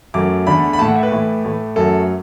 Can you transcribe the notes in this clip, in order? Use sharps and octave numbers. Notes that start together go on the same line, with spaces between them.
F#2 F#3 A3 D6
E2 D3 A3 B5
B5
A2 A3 A5
F#5
E5
B4
A2 E3 A3
A2 A3
F#2 F#3 A3 A4